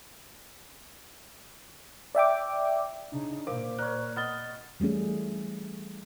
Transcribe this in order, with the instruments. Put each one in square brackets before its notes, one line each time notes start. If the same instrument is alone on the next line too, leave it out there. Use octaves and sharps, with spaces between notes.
[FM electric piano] D5 E5 G5 D6
[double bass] C#3 D#4 [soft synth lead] D4
[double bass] A#2 [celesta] A#4 F5 [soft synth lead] C5 [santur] D6
[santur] A#4 C#5 [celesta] D5 F#6
[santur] B3 [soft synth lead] D#5 [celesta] F6 A6 G7
[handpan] E3 G3 A3 C#4 G#4